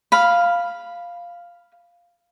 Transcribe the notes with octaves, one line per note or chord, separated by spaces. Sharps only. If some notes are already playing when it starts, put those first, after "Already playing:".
F5 B5